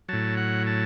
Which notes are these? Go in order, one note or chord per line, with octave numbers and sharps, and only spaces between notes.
A2 F#3 A5
F#5
A5